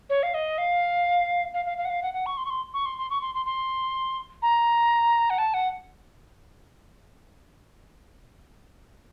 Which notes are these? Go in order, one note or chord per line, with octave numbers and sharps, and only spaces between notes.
C#5
F5
D#5
F5
F5
F5
F5
F#5
F5
F#5
F#5
C#6
C6
C#6
C6
C#6
C6
C6
C#6
C6
C6
C6
A#5
F#5
A5
F#5